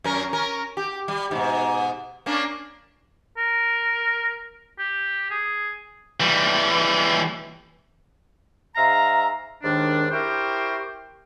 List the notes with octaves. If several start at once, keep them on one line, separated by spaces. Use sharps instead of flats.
F#2 C#4 A#4
C#4 A#4
G4
G3
G#2 B2
A#3 C#4 D4
A#4
G4
G#4
E3 G3
G#2 E5 F5 A#5
D#2 G#2 D#3 D4
E4 G4 A#4 C5 G5 C#6